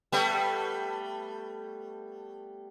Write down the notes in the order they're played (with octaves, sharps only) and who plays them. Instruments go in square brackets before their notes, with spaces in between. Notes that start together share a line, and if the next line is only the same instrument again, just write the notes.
[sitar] G3 A3 B3